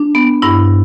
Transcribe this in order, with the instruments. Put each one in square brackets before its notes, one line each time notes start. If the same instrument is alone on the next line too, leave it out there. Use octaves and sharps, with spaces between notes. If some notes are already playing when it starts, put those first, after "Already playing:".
Already playing: [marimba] D4
B3
G2 E4